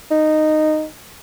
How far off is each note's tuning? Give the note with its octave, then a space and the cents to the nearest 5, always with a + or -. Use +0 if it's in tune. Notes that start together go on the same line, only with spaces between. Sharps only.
D#4 -10